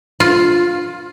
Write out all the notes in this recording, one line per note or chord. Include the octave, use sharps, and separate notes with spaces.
F4